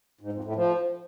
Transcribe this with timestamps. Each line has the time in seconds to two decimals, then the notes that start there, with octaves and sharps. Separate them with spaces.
0.21 G#2
0.32 F2
0.44 A2
0.56 F3